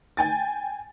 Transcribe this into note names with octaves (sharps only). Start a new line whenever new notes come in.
G5 G#5 A6